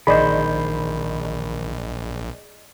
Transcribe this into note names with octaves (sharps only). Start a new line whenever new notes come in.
A#1 D#3 G#4 C5 D5 D#5 B5